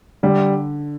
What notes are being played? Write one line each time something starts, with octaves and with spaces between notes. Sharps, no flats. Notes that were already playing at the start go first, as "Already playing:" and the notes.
D3 G3